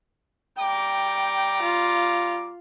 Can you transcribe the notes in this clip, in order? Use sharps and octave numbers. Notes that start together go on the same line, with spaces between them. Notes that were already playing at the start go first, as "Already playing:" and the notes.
G3 G5 A#5 D6
F4